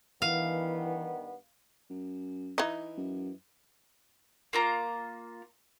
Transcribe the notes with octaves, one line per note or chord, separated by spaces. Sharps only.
G2 D#3 E3 B3 F5
F#2
E3 D#4
F#2
A#3 F4 A#5